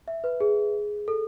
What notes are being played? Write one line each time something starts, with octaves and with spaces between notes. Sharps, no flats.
E5
B4
G#4
A4